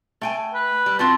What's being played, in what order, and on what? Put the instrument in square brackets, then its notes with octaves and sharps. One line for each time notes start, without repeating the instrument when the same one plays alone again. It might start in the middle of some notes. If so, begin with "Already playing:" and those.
[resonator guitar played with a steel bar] A3 G5 G#5
[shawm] B4
[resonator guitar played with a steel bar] G3
[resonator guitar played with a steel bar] C4 F4 F#4 [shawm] A5